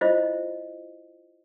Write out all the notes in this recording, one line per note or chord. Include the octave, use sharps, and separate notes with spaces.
E4 F4 C5 D#5 F5